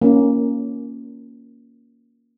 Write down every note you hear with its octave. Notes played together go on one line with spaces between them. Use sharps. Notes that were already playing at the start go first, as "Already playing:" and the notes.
A#3 C#4